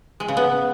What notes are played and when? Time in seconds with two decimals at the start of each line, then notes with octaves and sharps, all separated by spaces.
0.20 G#3
0.28 C#3
0.37 B3